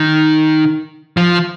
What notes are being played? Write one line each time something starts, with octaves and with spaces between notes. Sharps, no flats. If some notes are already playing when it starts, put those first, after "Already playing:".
Already playing: D#3
F3